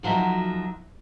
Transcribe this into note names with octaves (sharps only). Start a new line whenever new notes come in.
D2 F3 F#3 D#4 E5